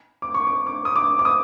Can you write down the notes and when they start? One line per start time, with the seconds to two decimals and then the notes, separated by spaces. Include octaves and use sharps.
0.22 D6
0.34 C#6
0.47 D6
0.67 D6
0.85 D#6
0.96 D6
1.19 D6
1.25 D#6